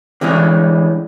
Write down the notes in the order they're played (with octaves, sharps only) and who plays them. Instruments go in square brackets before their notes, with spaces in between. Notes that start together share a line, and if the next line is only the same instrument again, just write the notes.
[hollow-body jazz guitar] D3 E3 G#3 C#4